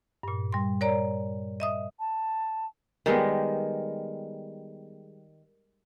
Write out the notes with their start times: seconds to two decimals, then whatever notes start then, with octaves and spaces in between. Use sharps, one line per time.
0.23 G2 A#2
0.52 G3 C6
0.81 A#4 C#5 D5 A#5
1.60 D#5 E5 D#6
2.00 A5
3.06 D#3 G3 G#3 B3